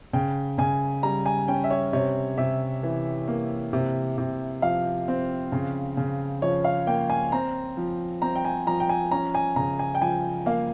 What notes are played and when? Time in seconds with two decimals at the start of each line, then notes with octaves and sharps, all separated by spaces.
0.13 C#3 G5
0.58 C#3 G#5
1.03 G3 A#5
1.26 G#5
1.48 C#4 G5
1.64 E5
1.71 C#5
1.93 C3 C#5
2.38 C3 E5
2.83 E3
3.28 A#3
3.73 C3
4.18 C3
4.62 F3 F5
5.08 C4
5.52 C#3
5.97 C#3
6.42 F3 C#5
6.64 F5
6.87 A#3 G5
7.10 G#5
7.32 C4 A#5
7.77 F3
8.22 C4 A#5
8.35 G5
8.45 G#5
8.67 F3 A#5
8.80 G5
8.89 G#5
9.11 C#4 A#5
9.35 G#5
9.56 C#3 A#5
9.79 G#5
9.95 G5
10.01 F3 G#5
10.46 A#3 F5